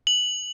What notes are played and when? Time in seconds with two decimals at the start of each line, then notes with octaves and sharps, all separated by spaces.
0.07 F#7